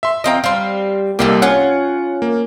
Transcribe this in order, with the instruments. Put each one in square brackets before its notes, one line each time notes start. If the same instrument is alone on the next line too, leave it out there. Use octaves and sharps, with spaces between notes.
[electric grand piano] E5 C6
[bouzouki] F3 C4 G5 [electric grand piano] D#5 F5 A#5
[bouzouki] G3 C4 [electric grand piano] F5 C6
[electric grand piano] C2 A#3 G4 [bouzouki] A4 D#5 F5
[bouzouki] C#4 F4 C#5 [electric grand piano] F#5
[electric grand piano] A#3